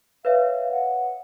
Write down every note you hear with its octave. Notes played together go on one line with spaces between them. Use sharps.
B4 C#5 E5 F5
F#5